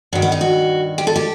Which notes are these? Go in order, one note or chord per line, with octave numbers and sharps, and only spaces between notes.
G2 D#3 F#3
B3
D#4
F#4
G4
A4
G4